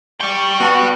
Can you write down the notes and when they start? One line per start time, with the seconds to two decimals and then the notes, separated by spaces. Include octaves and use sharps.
0.21 D5 G5 C#6
0.60 B3 F#4 A5 C#6